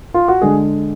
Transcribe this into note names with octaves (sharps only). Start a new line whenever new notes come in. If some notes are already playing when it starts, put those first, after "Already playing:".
F4
F#4
D3 G#3 G#4